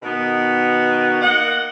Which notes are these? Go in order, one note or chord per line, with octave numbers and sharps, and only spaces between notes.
B2 D#3 B3 D#4 F#4
A#3 D#5 F#5